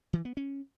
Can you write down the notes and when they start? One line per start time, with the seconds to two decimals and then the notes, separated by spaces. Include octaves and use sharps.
0.13 E3
0.25 B3
0.37 C#4